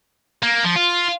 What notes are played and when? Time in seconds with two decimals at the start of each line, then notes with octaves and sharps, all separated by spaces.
0.43 A#3
0.64 F3
0.76 F4